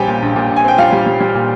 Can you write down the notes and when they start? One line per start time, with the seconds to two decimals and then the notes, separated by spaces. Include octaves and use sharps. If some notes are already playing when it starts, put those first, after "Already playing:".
Already playing: A#1 G3 C4 G4 G5 G#5
0.08 A#2
0.22 A#1
0.36 A#2
0.50 A#1
0.56 G#5
0.64 C4 G5
0.78 G3 F4 F5
0.92 G3
1.07 G3
1.21 G3
1.35 A#2